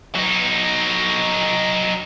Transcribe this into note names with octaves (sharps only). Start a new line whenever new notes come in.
F#3 D#4